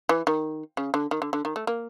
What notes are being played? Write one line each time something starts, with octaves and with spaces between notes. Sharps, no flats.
E3
D#3
C#3
D3
D#3
D3
D3
D#3
A3
A#3